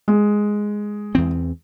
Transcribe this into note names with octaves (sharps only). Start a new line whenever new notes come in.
G#3
E2 E3 C4